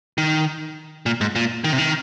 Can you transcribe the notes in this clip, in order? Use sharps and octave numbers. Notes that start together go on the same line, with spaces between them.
D#3
A#2
G#2
A#2
D#3
C3
D#3